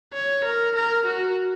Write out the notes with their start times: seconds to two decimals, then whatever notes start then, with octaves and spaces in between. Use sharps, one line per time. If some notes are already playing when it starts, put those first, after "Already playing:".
0.14 C#5
0.44 A#4
0.75 A#4
1.06 F#4